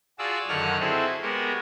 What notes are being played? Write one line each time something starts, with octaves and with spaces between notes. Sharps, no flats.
F4 F#4 G#4 D5 A5 E6
F#2 D3 D#3 C#5 F#5 F6
C4 E4 F#4 G#4 A4
G#3 B3 F#4 G4 A#4